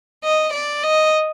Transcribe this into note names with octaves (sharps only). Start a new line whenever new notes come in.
D#5
D5
D#5